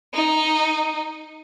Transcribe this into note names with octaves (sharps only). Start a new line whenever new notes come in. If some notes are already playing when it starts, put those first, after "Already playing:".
D#4